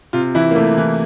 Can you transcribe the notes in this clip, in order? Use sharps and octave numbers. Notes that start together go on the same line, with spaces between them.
C3 F4
E3 E4
A#3
C3 A3
E3